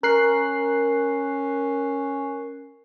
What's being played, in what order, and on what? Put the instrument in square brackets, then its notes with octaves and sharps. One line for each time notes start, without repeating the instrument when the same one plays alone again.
[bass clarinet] C#4 [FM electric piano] A#4 F#6 C7